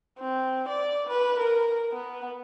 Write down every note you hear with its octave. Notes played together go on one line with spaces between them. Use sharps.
C4
D5
B4
A#4
B3